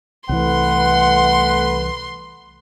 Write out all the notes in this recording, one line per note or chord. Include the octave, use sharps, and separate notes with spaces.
C2 E3 A3 B4 F#5 C6